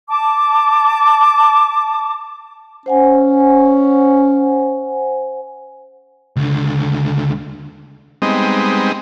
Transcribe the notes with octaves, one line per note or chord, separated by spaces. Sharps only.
A5 D6
C#4 C5 F#5 G#5
C#2 D3
G3 G#3 B3 C4 D#4